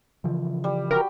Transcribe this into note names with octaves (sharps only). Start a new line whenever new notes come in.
C#3 E3 F3
G3
F#4 G4 A#4 G5